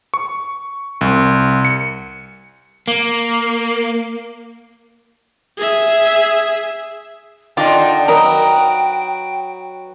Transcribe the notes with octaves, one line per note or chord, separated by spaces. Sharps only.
C#6
C2
C#7
A#3
G#4 E5
D3 D#3 D4 F4 G5 D6
F#3 A#4 B4 D#5 G5